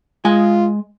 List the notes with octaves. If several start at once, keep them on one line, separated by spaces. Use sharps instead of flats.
G#3 F4 G#5